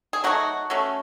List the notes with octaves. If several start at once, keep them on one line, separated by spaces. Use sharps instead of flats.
G#4
F#3 A3 D#4 F#4
F#3 A3 C#4